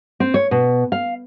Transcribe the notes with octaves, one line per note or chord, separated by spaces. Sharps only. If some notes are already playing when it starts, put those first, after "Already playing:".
C4
C#5
B2
F5